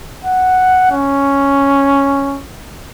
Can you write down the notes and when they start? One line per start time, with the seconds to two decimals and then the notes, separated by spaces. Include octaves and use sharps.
0.25 F#5
0.91 C#4